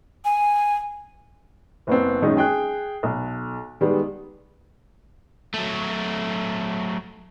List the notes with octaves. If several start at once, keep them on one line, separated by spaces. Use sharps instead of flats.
G#5
F#1 B3 C4
F#2 D#3 G#3 C#4 D#4
G#4 G5 F#6
B1
D#3 G3 G#3 B3
F#3 A3